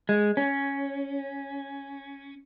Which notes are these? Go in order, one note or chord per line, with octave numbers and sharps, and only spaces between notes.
G#3
C#4